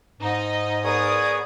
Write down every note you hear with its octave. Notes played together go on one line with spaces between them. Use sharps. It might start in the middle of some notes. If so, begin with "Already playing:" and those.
G#2 D#4 D#5
B3 G#4 A#4 C#5 D5 D#6